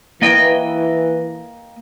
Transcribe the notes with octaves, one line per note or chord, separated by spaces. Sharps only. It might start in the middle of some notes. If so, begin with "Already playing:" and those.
E3 A#3 D#5 G5